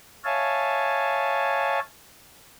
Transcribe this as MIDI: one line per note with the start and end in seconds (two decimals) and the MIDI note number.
0.24 1.79 73
0.24 1.79 76
0.24 1.79 77
0.24 1.79 80
0.24 1.79 81